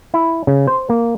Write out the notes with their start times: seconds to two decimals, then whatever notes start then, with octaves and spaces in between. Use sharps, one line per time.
0.14 E4
0.47 C#3
0.67 C5
0.89 A#3